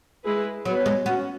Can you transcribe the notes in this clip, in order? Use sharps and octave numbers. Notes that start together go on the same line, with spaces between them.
G#3 E4 G#4 B4
F#3 B3 F#4 B4
G#3
B3 C#4 F#4